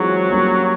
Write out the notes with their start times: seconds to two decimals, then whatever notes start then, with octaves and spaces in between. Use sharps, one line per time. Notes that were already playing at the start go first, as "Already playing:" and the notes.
Already playing: E3 F#3 G#3 C4 F4 G#4
0.30 G3 A#3 C#4 F#4